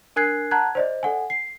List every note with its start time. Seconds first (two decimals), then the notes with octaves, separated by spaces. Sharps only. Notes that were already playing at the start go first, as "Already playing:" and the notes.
0.16 D4 A#4 G#5 F#6 G#6 C7
0.51 F#5 A5 A#5 F#6 G#6
0.75 C5 D5 D#5
1.03 A4 F#5 G#5
1.30 C7